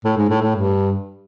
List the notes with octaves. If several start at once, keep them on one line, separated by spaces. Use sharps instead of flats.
A2
G#2
A2
A2
G2